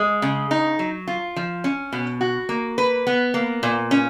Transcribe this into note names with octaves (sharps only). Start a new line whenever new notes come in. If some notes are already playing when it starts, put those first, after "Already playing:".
Already playing: G#3
C#3
D#4
F#3
F4
F3
C#4
B2
F#4
A#3
B4
B3
A#3
A#2
C#4